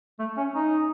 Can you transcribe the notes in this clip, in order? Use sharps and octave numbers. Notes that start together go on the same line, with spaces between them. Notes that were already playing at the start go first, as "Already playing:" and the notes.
A3
C#4
D#4